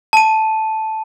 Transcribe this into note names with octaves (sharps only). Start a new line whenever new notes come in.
A5 D#7